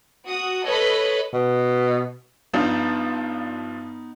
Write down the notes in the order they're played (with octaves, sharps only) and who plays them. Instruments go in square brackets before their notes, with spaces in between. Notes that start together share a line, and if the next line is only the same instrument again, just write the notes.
[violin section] F#4 D#6
A4 B4 C#5 D#5 B5
[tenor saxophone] B2
[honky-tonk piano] G2 F3 D4 [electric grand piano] B3 D#4